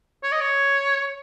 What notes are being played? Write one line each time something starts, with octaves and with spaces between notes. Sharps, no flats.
C#5
D#5
C#5